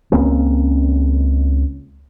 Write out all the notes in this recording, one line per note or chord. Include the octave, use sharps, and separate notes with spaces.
C#2 A#3 C4 C#4